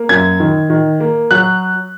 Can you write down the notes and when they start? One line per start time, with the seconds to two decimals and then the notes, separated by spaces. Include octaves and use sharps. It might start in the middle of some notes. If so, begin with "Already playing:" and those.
Already playing: A#3
0.09 F#2 G#6
0.40 D#3
0.70 D#3
1.00 A#3
1.31 F#3 F#6